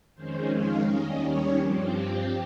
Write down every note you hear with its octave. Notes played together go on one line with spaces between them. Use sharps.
F2 D#3 G#3 C#4 C5
F5
D#2 D#3 G3 C#4 D#5
C#5
G2 F3 C4 G4